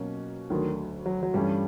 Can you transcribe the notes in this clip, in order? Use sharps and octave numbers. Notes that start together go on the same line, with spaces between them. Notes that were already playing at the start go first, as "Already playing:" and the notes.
Already playing: B2 F#3 A#3 C#4
D2 D3 D#3 F#3
F#3
F#3
G2 E3 G3 A3 C#4